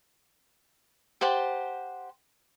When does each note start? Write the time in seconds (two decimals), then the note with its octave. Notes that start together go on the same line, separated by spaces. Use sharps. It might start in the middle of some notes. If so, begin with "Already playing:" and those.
1.21 G4 C5 F#5 A5